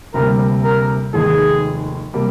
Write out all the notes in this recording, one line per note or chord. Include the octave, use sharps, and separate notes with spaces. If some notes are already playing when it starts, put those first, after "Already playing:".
D2 C3 G3 A#3 A#4
A#4
F1 D#2 D#3 G#3 G#4
C3 G3 A#3